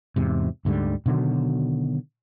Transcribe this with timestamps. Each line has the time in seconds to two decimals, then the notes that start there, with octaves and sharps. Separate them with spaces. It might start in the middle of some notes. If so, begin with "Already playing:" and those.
0.16 E2 G#2 C3
0.65 D2 G#2 D3 G3
1.06 B2 D3 D#3 F#3